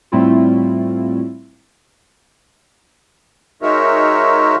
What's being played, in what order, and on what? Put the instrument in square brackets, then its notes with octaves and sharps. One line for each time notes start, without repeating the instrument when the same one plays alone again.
[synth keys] A2 G3 A3 C4 E4 F4
[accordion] G#3 D#4 F#4 A#4 C#5 E5